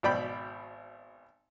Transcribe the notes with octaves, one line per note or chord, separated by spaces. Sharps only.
G#1 B2 D5 G5 B5